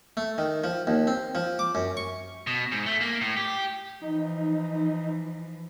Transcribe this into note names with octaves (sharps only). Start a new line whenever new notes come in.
A3
D#3
F3
D#2
C4
F3
D6
F#2
C#6
B2
G#2
A3
A#3
A2
G4
E3 F3 D#4